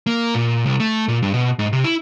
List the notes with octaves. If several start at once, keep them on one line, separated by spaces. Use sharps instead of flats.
A#3
A#2
C2
A3
A#2
G2
B2
G#2
C3
E4